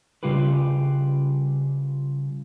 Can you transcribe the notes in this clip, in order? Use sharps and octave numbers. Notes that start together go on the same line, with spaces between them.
C#3 G3 F4 G4 B4